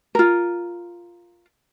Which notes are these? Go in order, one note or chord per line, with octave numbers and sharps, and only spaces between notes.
F4 A#4